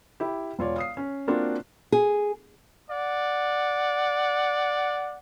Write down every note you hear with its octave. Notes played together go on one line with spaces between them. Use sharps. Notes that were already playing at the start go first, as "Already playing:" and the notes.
E4 G4
E1 F4 C#5 D5
F5 D#6 C7
C#4
A#3 C4 D4 F4 F#4
G#4
D5 F#5